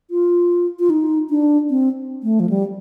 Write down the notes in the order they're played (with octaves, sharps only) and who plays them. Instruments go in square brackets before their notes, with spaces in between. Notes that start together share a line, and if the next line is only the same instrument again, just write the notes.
[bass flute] F4
F4
D#4
D4
C4
A3
F3
G3